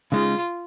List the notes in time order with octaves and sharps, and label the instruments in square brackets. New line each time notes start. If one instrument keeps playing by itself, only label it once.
[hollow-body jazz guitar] C#3 G#3 D#4 [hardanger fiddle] F4